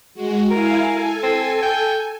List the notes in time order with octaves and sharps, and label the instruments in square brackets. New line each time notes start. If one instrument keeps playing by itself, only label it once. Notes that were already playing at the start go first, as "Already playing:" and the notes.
[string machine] G#3 F#4
[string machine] E4 F5 G#5 [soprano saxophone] A#4
[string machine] A4 G#5
[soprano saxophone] C4
G5